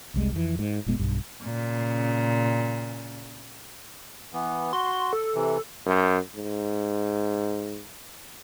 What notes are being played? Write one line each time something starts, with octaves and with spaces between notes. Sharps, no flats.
F1 C2 G3 G#3
F2 E3
G#2
F1 A#2 G#3 B3
B1 G2
A#2 C#3
E3 B3
F#4 C6
A4
C3 E3
F#2
G#2